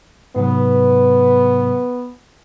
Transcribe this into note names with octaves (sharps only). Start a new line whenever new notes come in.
G#2 C3 F#3 B3 B4